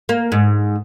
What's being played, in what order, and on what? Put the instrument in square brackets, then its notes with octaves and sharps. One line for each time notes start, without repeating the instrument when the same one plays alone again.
[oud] A#3
G#2